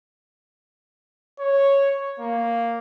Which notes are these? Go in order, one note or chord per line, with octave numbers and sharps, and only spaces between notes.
C#5
A#3